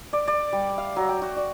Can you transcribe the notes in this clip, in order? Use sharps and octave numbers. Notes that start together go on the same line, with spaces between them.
D5
D5
G3
F5
F#3
G5
F#4
D5